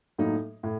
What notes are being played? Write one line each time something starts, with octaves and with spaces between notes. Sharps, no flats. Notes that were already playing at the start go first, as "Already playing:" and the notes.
A2 F#3 A#3 D#4
A2